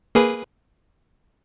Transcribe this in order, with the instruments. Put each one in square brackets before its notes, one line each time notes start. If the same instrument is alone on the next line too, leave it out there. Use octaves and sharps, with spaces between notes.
[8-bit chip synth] A#3 G#4 B4